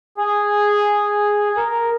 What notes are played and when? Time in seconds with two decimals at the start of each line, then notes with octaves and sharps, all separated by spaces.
0.17 G#4
1.57 A#4